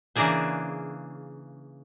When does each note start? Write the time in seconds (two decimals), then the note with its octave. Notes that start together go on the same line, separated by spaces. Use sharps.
0.16 C#3 E3 A#3 D4 G#4 C5